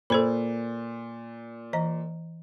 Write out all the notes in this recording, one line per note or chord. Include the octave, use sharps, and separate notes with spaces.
A#2 A4 C5 B5
E3 D#5 A#5